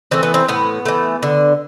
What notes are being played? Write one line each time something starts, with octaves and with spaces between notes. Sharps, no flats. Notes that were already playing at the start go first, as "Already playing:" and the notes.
E3 A3 C4
B3
C4
A2 B3
E3 A3
D3